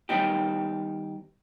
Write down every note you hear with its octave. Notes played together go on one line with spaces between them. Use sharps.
D#3 G3 B3 D#4 G4